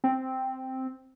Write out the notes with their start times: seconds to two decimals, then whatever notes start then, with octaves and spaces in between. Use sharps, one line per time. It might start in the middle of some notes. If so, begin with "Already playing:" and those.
0.04 C4